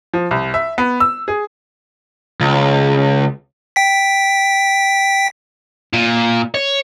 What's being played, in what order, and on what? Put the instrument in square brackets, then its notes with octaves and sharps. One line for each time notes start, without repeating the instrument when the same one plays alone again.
[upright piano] F3
C2
E5
B3
E6
G#4
[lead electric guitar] C#2
[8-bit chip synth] G5 B6
[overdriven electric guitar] A#2
C#5